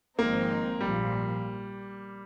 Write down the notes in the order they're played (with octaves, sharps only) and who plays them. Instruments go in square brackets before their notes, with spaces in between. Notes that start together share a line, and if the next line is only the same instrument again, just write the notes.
[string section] G#1 G#2 F3 C4 D#4 [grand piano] A#3
[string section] A#1 A#2 F3 [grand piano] G3